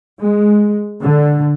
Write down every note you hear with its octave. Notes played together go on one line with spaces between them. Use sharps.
G#3
D3